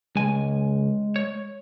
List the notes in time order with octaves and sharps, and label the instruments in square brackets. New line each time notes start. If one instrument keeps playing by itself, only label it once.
[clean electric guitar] C#2 G#5 [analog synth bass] G#3
[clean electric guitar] C#5